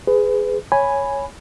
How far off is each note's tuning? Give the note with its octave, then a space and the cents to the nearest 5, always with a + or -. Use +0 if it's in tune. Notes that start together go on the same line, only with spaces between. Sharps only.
G#4 +0 B4 +25
C#5 +0 G#5 +0 B5 +0